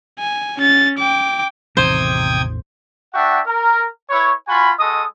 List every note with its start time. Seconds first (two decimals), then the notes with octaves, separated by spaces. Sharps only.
0.20 G#5
0.58 C#4 A6
0.98 G5 D6
1.77 A1 E2 C3 D#3 C5 G5 D#6 G#6
3.14 D4 F#4 E5 F#5 G5
3.46 A#4
4.10 E4 B4 C#5
4.48 F4 F#4 G#5 B5
4.80 G#3 F#4 A4 D#5 D#6